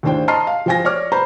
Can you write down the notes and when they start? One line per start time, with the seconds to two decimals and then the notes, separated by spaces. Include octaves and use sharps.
0.03 D#2 A2 D4 C5 G5
0.28 D#5 A5 A#5 C6 F6 C7
0.47 F5
0.66 F3 C5 G5 G#5 A#6
0.85 C#5 D5 D6 F6
1.12 B4 C5 A#5 B5